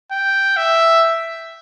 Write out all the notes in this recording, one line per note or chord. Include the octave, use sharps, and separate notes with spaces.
G5
E5